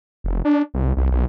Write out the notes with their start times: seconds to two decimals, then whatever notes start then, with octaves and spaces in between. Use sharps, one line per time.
0.24 F1
0.45 D4
0.74 C2
0.97 C2
1.11 B1